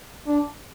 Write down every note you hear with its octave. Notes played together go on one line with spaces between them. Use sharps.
D4